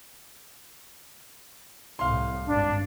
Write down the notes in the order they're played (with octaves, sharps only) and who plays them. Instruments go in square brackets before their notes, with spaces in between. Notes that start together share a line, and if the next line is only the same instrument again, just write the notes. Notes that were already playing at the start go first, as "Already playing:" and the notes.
[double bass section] C2 A2 [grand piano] F5 C6
[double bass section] G#1 G2 [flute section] D4